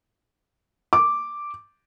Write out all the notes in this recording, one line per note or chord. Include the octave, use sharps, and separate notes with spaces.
D6